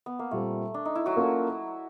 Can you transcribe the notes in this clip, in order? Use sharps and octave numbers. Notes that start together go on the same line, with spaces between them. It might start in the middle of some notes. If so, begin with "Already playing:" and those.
B3
A#3
A#2 G3 A3 C4
D4
D#4
E4
F#3 F#4
A#3 C#4 F4 A4